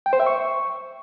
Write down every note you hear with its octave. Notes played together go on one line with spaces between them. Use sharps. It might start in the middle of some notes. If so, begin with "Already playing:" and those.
G5
C5
E5
C#6